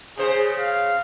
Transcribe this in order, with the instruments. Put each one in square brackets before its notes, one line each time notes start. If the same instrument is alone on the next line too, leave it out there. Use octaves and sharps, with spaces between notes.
[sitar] C#3 C5 [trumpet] G#4
[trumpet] F5